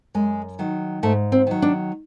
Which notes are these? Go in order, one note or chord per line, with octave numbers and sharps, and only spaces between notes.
F#2 G#3
D#3 F#3
G#2 A3
C4
D#3 F#3
D4